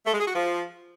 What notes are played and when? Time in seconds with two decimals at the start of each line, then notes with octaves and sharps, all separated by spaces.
0.06 A3
0.13 G#3
0.20 G#4
0.27 F#4
0.35 F3